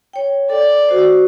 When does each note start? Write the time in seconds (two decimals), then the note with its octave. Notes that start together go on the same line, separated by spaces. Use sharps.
0.13 C#5 G5
0.50 A4 D5
0.89 F#4 C5